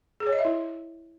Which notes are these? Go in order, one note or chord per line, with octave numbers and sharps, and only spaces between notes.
G#4
C#5
D#5
E5
E4